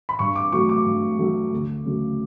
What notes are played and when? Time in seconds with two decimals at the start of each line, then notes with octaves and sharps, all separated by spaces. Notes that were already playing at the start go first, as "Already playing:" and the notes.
0.09 B5
0.19 G2 C#6
0.36 D6
0.52 F#3 A3 C#6
0.69 D6
0.86 G2
1.19 F#3 A3
1.53 D2
1.85 C#3 F#3 A3